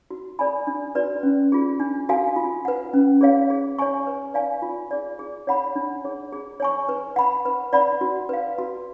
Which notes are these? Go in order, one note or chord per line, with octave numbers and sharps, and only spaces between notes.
F#4
A4 D5 G#5 B5
D4
F#4 B4 D5
C#4
F4 G#4
D4
F#4 A4 F5 G#5
F4
B4 F#5
C#4
G#4 C#5 F5
G#4
C#5 G#5 C#6
B4
D5 F5 G#5
F4
G#4 D5
G#4
C#5 F#5 B5
D4
G#4 C#5
G#4
C#5 G#5 C#6
B4
F#5 B5
B4
D5 F#5 B5
F#4
B4 F5
F#4